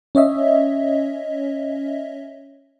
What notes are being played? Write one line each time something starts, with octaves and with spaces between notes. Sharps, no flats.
C#4 C#5 D#5 E5